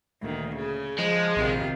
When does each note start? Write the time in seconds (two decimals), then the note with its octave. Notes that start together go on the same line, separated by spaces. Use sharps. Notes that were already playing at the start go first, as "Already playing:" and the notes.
0.20 D2 A#2 D#3
0.55 C#3
0.98 F3 G#3
1.37 A#1 C3 D#3 F4